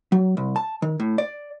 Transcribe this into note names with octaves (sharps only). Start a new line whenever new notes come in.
F#3
C2
A5
D#3
A2
D5